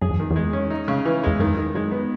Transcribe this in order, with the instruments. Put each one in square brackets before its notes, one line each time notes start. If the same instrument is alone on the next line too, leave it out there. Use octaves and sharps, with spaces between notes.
[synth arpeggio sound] F#2 [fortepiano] G#4
[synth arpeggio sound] E2
[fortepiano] D#3
[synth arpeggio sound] E2
[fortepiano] G#3
C#4
D#4
C#3
E3
[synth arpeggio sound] E2 [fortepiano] G#3
[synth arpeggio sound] F#2 [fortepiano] D#3
[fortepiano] D#3
[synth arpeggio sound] F#2 [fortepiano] G#3
[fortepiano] B3